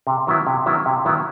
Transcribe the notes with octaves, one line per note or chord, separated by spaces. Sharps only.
C3
D#3 F#3 B3 E4
C3
D#3 F#3 B3 E4
C3
D#3 F#3 B3 E4